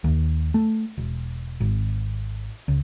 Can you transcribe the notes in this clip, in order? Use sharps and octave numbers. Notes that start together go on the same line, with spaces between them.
D#2
A3
E1
G#1
C#2